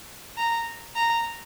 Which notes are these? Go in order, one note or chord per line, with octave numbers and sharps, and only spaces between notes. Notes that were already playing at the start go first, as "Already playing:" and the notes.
A#5
A#5